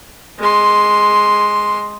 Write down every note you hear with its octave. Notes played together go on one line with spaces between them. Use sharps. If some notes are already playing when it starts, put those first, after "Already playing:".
G#3 C6